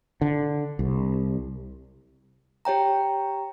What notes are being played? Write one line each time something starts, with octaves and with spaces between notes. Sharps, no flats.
D3
C2
G4 C#5 G5 A#5